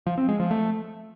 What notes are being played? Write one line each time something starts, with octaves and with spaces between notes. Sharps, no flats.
F3
C4
G#3
F3
A3